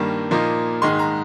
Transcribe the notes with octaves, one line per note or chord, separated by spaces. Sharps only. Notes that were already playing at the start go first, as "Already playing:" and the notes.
Already playing: G2 D#3 G3 A#3
A#2 F3 A#3 D#4
G#2 D#3 G#3 C6
A#5